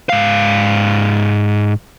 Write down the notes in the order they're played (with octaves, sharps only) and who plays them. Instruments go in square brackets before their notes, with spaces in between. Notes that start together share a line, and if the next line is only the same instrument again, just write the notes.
[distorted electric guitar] G#2 F5